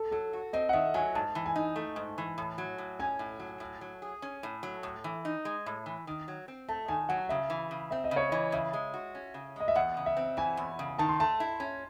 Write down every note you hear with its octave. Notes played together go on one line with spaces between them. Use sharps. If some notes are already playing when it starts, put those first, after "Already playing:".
Already playing: A4
F#3 A4
F#4
C4 D#5
F#5
D#3 E5
F#3 G#5
G#2 A5
E3
G#5
D#4
A3
G#2
E3
A2
F#3
A2
C#4 G#5
A2
F#3
A2
F#3
G#4
C#4
A2
F#3
A2
E3
D#4
G#3
A2
E3
D#3
F#3
C4
A3 A5
D#3 G#5
F#3 F#5
C#3 E5
E3
C#3
C4 E5
D#5
C#3
C#5
E3 D#5
C#3 E5
G#3
F#4
C#4
C#3
G#3 D#5
E5
E2 F#5
C#3
E5
C4
E3 G#5
E2
C#3
D#3 A5
C6
A3 A5
E4
C#4